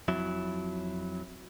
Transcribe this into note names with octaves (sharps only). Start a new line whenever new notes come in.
F2 F#3 E4